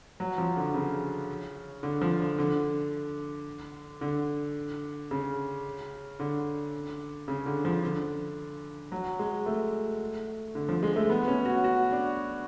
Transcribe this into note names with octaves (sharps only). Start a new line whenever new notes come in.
F#3
F3
D3
C#3
D3
F3
D3
D3
D3
C#3
D3
C#3
D3
F3
D3
F#3
G#3
A3
D3
F3
G#3
A3
B3
C#4
F#4
F#4
D4